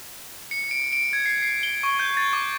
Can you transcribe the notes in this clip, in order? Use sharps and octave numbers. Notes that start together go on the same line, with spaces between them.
C#7
D7
D7
G#6
C7
C7
G7
C#6
G6
A6
D6